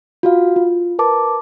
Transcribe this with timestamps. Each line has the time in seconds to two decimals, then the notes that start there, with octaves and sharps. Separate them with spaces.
0.23 F4 F#4 F5
0.56 F4
0.99 A#4 B4 A5 D6